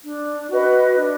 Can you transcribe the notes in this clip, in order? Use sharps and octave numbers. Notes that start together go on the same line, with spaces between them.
D4
F#4 B4 D#5
D4